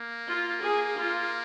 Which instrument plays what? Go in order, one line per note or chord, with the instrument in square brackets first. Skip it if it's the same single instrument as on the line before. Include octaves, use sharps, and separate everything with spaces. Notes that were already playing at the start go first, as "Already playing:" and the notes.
Already playing: [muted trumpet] A#3
[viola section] F4
G#4
F4